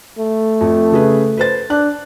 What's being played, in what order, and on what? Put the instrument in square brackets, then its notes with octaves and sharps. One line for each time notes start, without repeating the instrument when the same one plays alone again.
[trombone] A3
[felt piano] F2
C#3 G#4 B4
B4 C5 A6
[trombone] D4 [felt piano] F#6